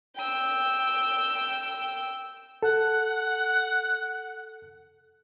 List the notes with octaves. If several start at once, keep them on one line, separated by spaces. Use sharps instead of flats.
G5 E6
A4 F#5